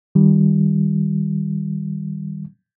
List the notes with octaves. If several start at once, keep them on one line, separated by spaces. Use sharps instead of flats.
D#3 G3